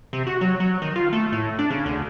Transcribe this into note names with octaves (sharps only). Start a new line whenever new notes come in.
C3
F#4
F#3
F#3
D#3
F4
A3
A2
D4
C#3
D2